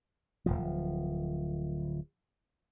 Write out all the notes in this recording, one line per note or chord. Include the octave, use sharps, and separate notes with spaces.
D1 G#1 F3